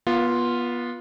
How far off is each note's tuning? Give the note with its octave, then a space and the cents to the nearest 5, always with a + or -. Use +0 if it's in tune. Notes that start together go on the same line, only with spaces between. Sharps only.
B3 -25 F4 +0